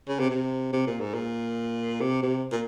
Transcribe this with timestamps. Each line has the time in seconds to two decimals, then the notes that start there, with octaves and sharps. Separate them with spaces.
0.08 C#3
0.19 C3
0.30 C3
0.73 C3
0.87 A#2
1.00 G#2
1.14 A#2
2.01 C3
2.23 C3
2.52 A#2